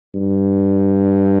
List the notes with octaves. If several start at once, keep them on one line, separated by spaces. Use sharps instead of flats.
G2